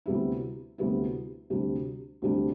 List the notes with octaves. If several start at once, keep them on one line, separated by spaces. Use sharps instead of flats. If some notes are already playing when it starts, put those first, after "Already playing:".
D2 C3 G3 B3 E4
D2 C3 G3 B3 E4
D2 C3 G3 D4
D2 C3 G3 D4